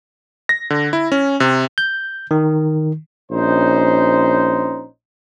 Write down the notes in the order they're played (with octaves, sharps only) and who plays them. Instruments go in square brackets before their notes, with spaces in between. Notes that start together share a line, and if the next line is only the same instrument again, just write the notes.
[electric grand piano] A#6
D3
E4
C#4
C3
[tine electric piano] G6
D#3
[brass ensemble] A#1 C#4 D#4 C5